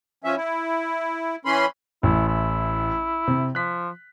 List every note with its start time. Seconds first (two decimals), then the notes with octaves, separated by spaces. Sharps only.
0.24 F3 C#4 E5
0.37 E4
1.45 E3 C#4 B5 C6
2.03 A1 E4
2.28 E4
3.28 C3
3.55 F3 F#6 B6